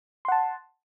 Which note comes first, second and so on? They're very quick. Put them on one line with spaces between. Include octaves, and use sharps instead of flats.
C6 F#5 A5